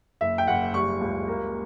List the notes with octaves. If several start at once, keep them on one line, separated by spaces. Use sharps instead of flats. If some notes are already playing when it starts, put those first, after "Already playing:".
F#1 E5
G5
F#1 F#5
G3 C#6
C#2
A#3